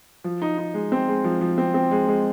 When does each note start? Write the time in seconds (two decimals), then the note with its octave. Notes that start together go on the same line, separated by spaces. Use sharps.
0.24 F3
0.42 D#4
0.58 D#4
0.74 G#3
0.92 C4
1.08 G#3
1.24 F3
1.41 F3
1.58 C4
1.74 C4
1.91 G#3
2.07 G#3